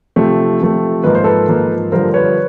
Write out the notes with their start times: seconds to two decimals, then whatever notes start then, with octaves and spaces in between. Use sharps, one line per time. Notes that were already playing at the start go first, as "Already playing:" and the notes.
0.16 C3 F3 A3
0.60 C3 F3 A3
1.04 G#2 F3 A#3 B4
1.15 C5
1.24 A4 B4
1.48 G#2 F3 A#3
1.92 G2 D3 F3 A#4 C5
2.14 B4 C#5